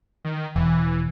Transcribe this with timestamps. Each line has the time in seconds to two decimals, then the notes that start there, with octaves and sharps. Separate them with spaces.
0.25 D#3
0.56 E1 E3